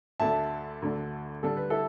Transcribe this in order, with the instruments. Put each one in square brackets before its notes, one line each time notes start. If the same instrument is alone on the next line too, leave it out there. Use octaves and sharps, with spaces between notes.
[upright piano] D2 D3 A3 D4 [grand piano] E5 A5
[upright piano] D2 D3 A3 D4
[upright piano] D3 G3 D4 [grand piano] A4
[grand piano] B4
E4 A4